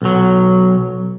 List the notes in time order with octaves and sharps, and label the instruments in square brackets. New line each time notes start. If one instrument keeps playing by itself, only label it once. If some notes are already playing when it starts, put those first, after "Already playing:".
[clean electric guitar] B1 F#3